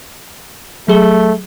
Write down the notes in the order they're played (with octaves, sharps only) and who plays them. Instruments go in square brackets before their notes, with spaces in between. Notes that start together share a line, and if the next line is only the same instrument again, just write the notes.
[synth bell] F#3 G#4 G7 [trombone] A3